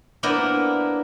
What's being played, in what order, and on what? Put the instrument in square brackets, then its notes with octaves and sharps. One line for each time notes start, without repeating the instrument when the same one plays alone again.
[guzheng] A#3 B3 D4 E4 A#4 C5